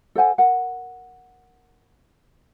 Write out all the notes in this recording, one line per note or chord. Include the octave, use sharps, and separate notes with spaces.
A4 C5 F#5 G#5
A#4 F#5